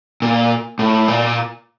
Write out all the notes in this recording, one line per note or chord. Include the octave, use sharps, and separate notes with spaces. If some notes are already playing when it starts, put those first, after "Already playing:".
A#2
A2
A#2